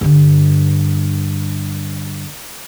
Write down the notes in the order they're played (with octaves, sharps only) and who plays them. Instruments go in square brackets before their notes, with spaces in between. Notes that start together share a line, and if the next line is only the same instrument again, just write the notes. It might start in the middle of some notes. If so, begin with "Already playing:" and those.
[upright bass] G2 D3